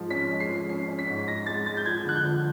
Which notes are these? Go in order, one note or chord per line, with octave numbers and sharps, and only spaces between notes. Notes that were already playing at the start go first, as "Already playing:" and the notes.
Already playing: G#2 F3 G#3
C#4 B6
G#3
C7
F3
C#4 C7
C#4
B6
G#2
G#3 A#6
G#3 A6
G#3 A6
G6
F3 G#6
D3 F#6
G6
F3